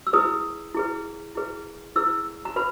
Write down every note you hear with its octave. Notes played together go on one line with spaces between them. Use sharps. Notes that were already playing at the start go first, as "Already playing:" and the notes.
E6
E4 G#4 B4 D#6
E4 G#4 B4
E4 G#4 B4
E4 G#4 B4 E6
A#5
B4 B5